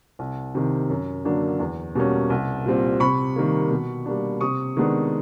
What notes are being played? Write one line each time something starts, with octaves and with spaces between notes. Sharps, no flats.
C2
C3 D#3
F#2
D3 F#3 A#3 D4
E2
B2 G3 A#3 C#4
C2
A#2 G3 C4
C3 B5 C#6
D#3 G3 A#3
B2
G3 A#3 D4
C3 C#6 D#6
D#3 G#3 B3 D4